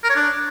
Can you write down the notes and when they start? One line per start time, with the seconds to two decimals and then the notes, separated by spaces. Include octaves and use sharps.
0.04 A#4
0.10 C#5
0.16 D4